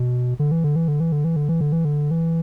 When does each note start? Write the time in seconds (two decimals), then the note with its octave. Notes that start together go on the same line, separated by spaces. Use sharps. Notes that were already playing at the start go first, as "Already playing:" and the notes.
Already playing: B2
0.39 D3
0.52 E3
0.64 D3
0.76 E3
0.88 D3
1.00 E3
1.12 D3
1.25 E3
1.36 D3
1.49 E3
1.61 D3
1.72 E3
1.85 D3
2.11 E3